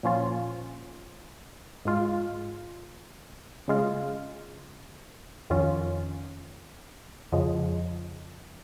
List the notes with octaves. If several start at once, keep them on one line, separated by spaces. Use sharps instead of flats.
A#2 F3 C#4 F4
G#2 G#3 F4
C#3 G#3 F4
F2 D#3 C#4 F4
F2 C#3 F3 G#3